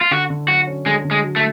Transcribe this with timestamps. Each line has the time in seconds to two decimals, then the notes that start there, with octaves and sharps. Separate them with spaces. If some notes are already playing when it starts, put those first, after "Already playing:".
0.01 F4
0.11 D3 F#4
0.30 D3
0.48 F#3 F#4
0.67 C#4
0.86 D3 G#3
1.05 D3
1.11 G#3
1.23 F#3
1.36 A3